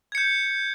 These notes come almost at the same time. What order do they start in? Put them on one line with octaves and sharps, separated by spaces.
G#6 C#7 G6